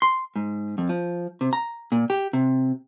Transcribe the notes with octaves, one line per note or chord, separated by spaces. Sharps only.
C6
G#2
F2
F3
C3
A#5
A#2
G4
C3